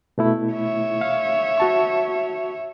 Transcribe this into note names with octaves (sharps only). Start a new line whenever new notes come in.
B2 A3 E4
C#5 E5
F5
F#4 A5 C#6